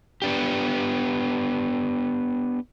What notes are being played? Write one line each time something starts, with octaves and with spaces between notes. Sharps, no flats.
B3 D4 G4